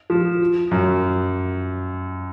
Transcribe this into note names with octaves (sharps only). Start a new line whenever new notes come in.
F3
F#2